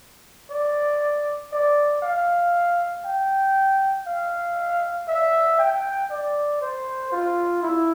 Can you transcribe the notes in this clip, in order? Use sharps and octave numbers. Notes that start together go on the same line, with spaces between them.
D5
D5
F5
G5
F5
E5
G5
D5
C5
F4
E4